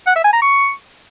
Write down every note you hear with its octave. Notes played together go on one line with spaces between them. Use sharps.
F#5
E5
G#5
A#5
C#6